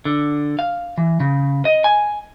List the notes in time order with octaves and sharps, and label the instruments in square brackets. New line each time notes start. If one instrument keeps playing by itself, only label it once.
[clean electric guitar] D3
F5
E3
C#3
D#5
G#5